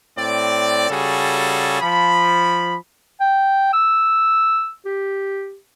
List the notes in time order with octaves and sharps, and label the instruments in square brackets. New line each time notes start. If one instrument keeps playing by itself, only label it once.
[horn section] A2 C4 D5
C#3 G3 F#4 G#4 A4
F3 B5
[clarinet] G5
E6
G4